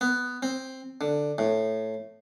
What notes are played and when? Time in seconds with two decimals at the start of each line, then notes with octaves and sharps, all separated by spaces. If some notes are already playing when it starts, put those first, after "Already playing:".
0.01 B3
0.43 C4
1.01 D3
1.38 A2